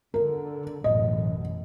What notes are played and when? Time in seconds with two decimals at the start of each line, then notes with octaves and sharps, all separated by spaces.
0.14 D3 A#4
0.84 A1 F#2 B2 D#5